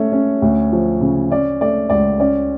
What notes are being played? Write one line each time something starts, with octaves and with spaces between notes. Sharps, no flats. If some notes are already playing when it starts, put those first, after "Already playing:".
Already playing: A3 C#4 C#5
C#4
D2
F3
C#3
C#4 D5
A3 D5
C#2 D5
C#4 D5